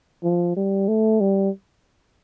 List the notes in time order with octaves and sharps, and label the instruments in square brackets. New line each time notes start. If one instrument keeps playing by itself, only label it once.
[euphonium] F3
G3
A3
G3